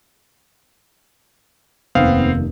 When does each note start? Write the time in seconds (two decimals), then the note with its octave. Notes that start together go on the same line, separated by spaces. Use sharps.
1.95 F1 D#2 B3 C4 F5